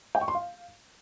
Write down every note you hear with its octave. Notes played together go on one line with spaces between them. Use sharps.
G5
C#6
C6
F5